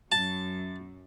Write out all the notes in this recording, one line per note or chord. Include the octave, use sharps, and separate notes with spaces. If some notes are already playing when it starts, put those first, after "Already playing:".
F#2 A5